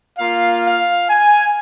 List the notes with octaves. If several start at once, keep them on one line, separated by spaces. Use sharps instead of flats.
A#3 F4 F5
F5
G#5